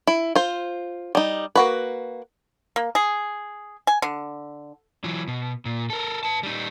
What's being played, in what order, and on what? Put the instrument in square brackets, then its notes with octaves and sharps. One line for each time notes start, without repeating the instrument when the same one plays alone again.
[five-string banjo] E4
F4 C5
G3 D#4
A#3 F#4 B4
[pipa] A#3
G#4
G#5
D3
[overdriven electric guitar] E3 F#3
B2
A#2
A4 A#4
B4 A5
G3 D#4